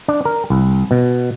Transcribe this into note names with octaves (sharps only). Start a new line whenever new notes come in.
D4
A#4
C2
B2